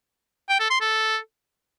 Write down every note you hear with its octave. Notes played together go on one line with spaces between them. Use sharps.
G5
A4
C6
A4